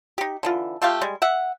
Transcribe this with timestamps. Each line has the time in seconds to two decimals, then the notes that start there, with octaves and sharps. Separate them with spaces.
0.18 D#4 G4
0.43 D3 E3 F4
0.82 A3 F4 G4 F5
1.01 G3 G#3
1.22 E5 F#5